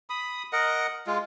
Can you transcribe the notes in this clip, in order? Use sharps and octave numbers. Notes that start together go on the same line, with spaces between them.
B5 D#6
A#4 D#5 F#5
G#3 F4